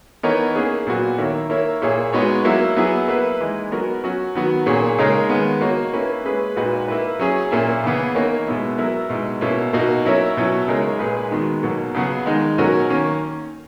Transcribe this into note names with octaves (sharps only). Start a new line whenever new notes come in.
E3 B3 D#4 A#4 C#5
A#3 C#4 G#4
A#2 F#3 B3 F#4
D#3 A#3 E4 A#4 C#5
A#3 E4 A#4 C#5
A#2 A#3 E4 G#4 C#5
G#3 B3 D#4 F#4 C#5
F#3 A#3 E4
F#3 B3 E4 G#4
A#3 E4 B4
E3 G#3 D#4
F#3 B3 F#4 A#4
F#3 C#4 F#4
D#3 F#3 B3 F#4
A#2 A#3 C#4 G#4 C#5
C#3 G#3 D#4 A#4 C#5
D#3 G#3 B3
A#3 D#4 F#4 C#5
A#3 C#4 E4 B4
G#3 C#4 G#4 B4
A#2 G#3 D#4 F#4 B4
A#3 E4 B4
F#3 C#4 G#4
A#2 A#3 C#4 E4
C#3 E3 B3
E3 A#3 D#4 A#4 C#5
B2 G#3 B3 E4
F#3 B3 E4 A#4
B2 G#3 D#4
B2 A#3 C#4 E4
B2 A#3 D#4 F#4
F#3 C#4 E4 A#4 C#5
B2 F#3 C#4 E4
C#3 G#3 D#4 A#4 C#5
A#2 G#3 D#4 G#4 B4
D#3 G#3 B3 F#4
B2 F#3 A#3
C#3 F#3 B3 F#4
D#3 G#3 D#4
B2 F#3 C#4 F#4 A#4
D#3 A#3 C#4